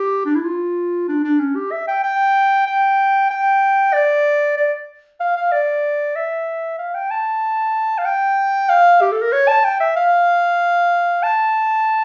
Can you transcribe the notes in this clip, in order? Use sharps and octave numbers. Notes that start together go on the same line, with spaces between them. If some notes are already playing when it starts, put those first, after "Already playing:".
Already playing: G4
D4
E4
F4
D4
D4
C#4
G4
E5
G5
G5
G5
G5
D5
D5
F5
F5
D5
E5
F5
G5
A5
F5
G5
F5
G4
A4
A#4
C#5
A5
G5
E5
F5
A5